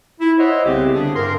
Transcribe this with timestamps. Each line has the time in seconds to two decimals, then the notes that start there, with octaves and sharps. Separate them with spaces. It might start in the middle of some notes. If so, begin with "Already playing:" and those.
0.21 E4
0.39 C5 C#5 D#5 E5 F#5 C6
0.65 C2 C#3 B3 C4 G4
0.94 D3 D4 G#4
1.15 G2 A#4 C6